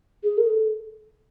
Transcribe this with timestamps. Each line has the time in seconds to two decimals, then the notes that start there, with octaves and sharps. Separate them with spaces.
0.23 G#4
0.37 A#4
0.47 A4